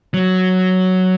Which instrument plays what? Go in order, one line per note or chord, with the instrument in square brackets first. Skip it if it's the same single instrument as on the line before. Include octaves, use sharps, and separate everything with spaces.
[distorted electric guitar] F#3